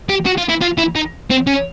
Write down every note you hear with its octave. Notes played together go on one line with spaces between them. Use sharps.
G4
F#4
F4
E4
F4
E4
D#4
C4
C#4